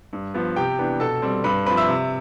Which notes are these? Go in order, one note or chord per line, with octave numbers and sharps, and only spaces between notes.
G2
F3 B3
C3 G4 G5
E3 B3 D4
B2 A4 A5
G3 C4
G2 B4 B5
F3 C4 B4 B5
E5 E6
C3